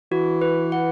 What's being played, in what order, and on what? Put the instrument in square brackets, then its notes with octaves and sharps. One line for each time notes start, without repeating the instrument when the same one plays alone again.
[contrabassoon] E3 [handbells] F#4
[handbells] B4
F#5